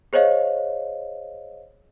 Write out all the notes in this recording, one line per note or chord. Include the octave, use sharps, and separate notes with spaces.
G#4 C5 C#5 D#5 F5